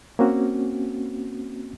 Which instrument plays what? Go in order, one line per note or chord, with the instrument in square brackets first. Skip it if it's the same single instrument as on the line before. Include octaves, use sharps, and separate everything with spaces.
[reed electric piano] A#3 C4 C#4 F#4